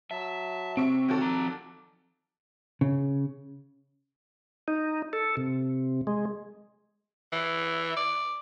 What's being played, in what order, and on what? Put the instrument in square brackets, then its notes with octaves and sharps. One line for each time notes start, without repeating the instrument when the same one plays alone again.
[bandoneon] F#3 A5 [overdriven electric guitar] E5
[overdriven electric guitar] C3 [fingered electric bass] C4 [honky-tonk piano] E5 C#6 D7
[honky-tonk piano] D#3 F#4 A4 [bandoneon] E3 C#5 G5
[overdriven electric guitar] F3 A#5 [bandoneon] D6
[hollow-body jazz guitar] C#3
[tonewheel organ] D#4
A4
C3
G#3
[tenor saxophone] E3
D5